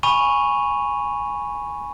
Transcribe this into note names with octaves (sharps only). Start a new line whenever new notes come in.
G#5 B5 C#6 D#7 F7